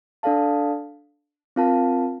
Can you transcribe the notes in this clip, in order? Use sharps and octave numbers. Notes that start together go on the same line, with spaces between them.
D4 A4 D5 F5 A5
C4 F4 A#4 F5 A5